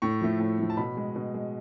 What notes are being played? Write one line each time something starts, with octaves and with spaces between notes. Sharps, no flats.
A2 C#6
F3 A3
A2
F3 A3
A5
B2 B5
G#3
B2
G#3